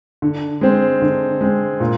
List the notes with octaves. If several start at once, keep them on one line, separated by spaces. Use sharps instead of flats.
D3
G#3 C4
D3
G#3 C4
A#2